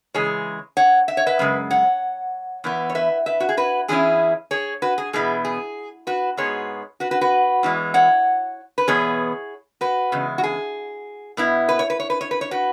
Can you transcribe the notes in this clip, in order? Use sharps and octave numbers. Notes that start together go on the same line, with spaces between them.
C#3 E3 G#3 G#4 C#5
C#5 F#5
E5
C#5
B4 E5
F#2 C#3 G#3
C#5 F#5
E2 E3 B3
C#5
B4 E5
B4 E5
F#4
G#4
F#4 B4
E2 E3 C#4 E4 G#4
G#4 C#5
F#4 B4
G#4
E2 B2 B3 E4 G#4
G#4
F#4 B4
G#2 G#3 B3 G#4 C#5
F#4 B4
F#4 B4
F#4 B4
E2 E3 G#3
C#5 F#5
B4
E2 B2 B3 G#4 C#5
F#4 B4
E2 C#3 G#3
F#4
G#4
B2 B3 E4
B4
C#5
B4
C#5
B4
C#5
B4
C#5
F#4 B4